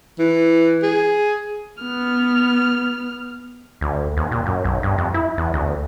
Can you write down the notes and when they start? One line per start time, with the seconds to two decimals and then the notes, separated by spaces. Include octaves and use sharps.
0.19 E3
0.83 G#4
1.83 B3 F6
3.81 D2
4.17 D#2
4.32 A#2
4.46 F#2
4.64 B1
4.83 G2
4.98 F2
5.14 E4
5.38 E2
5.54 D2